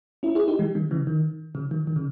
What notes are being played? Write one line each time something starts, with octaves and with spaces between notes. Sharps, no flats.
C#4 E4
E4 G#4
D#4 G4
E3 G#3
D#3 G3
C#3 E3
D#3
C#3
D#3
D#3
C#3